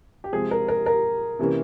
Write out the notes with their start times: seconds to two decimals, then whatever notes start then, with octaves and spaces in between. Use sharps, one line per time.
0.24 G4
0.32 C3 F3 G#3 C4 G#4
0.51 A#4
0.68 A#4
0.86 A#4
1.39 C3 E3 A#3 C#4